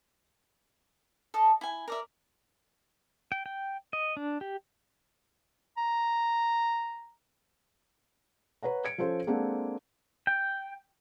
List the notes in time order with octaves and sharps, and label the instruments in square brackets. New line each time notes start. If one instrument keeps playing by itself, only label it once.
[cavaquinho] A4 D#5 A5
E4 G#5
A#4 D5 E5
[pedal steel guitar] G5
G5
D#5
D4
G4
[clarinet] A#5
[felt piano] B4 C#5 F#5 A#5
G#6 C#7 D7
F3 C#4 A4 C5
G#3 A#3 C4 D4 A4 F#5
[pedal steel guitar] G5